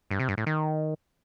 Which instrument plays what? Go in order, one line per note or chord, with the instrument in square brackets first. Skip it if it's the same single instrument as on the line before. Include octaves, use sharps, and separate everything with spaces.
[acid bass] G2
C3
G2
A2
D#3